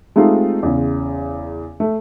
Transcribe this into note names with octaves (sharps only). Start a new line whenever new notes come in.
G#3 A3 C4 D#4 F4 G4
E2 C#3
A3